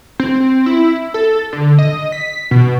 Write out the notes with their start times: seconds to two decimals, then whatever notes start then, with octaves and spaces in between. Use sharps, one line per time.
0.20 C4
0.66 E4
1.14 A4
1.53 D3
1.79 D#5
2.12 B6
2.51 B2